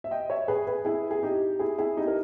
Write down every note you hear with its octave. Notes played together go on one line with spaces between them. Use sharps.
E5
D#5 G5
C#5 E5
G#4 B4
G#4 B4
E4 G#4
G#4
D#4 G4
E4 G#4
E4 G#4
D#4 G4
A#4